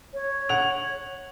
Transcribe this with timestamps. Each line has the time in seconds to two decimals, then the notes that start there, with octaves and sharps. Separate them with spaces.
0.14 C#5
0.49 F#5 F7